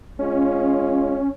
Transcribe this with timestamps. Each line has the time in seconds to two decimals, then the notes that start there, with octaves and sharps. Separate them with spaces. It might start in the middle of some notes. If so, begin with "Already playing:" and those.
0.19 G#3 C#4 F4